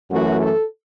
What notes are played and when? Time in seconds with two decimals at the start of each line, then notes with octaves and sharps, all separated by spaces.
0.11 F#2 E3 A3 F#4
0.40 A4